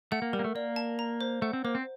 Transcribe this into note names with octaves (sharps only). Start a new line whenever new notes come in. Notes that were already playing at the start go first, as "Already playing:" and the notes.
A3 F#5
A#3
G3 A#4
A#3
A3
A#3 D5
A5
A#5
C5
A3 F#5
C4
A#3 C5
C4